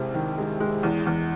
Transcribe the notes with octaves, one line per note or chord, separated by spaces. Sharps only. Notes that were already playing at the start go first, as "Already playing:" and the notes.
Already playing: C2 C3 G#3 E4
D#3
G#3
G#3
E2
E2